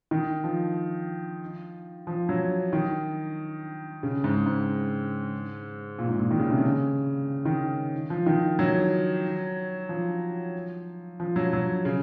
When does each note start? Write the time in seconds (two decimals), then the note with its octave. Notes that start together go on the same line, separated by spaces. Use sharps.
0.11 D#3
0.44 F3
2.07 F3
2.29 F#3
2.73 D#3
4.03 C#3
4.24 G#2
4.46 G#2
5.99 A#2
6.09 G#2
6.20 A#2
6.31 D#3
6.39 C#3
6.49 C3
6.58 C#3
7.45 D#3
8.10 F3
8.26 D#3
8.59 F#3
9.89 F3
11.20 F3
11.36 F#3
11.53 F#3
11.85 C#3